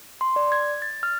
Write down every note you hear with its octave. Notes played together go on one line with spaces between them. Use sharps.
C6
D5
G#6
A6
F6